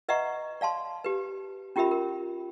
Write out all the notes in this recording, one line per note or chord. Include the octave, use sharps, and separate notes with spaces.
B4 D#5 E5 F#5 A#5 C#6
D5 F5 A5 C6
G4 B4
C#4 F4 G4 A#4 E5 B5
A#4